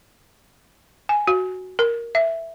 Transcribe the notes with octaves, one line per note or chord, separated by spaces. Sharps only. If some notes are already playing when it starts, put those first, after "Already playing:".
G#5
F#4
A#4
E5